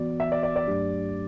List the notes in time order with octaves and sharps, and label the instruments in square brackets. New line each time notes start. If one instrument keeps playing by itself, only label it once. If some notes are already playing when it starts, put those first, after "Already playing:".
Already playing: [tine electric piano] E3 B3 F#4 [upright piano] D5
[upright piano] E5
D5
D5
D5
[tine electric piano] G2 F#3 A3 D4 G4